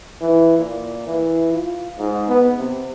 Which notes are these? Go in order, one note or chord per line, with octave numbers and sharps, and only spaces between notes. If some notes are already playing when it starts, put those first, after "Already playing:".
E3
A#2
E3
F4
G#2
B3
C3